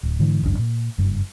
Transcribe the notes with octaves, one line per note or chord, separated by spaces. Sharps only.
D1
G#2 D3 E3
G#1 C#2 F#2 D4
A#2
F#1 G2